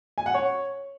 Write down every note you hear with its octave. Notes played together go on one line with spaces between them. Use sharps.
G#5
F#5
C#5